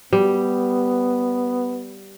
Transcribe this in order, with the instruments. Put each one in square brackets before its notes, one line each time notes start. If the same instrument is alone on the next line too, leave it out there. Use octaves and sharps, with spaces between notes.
[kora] G3 [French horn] B3